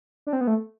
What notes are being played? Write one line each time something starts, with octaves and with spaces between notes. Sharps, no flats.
D4
C4
B3
A3